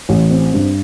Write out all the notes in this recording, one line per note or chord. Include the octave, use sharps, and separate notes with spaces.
A1
C4
G2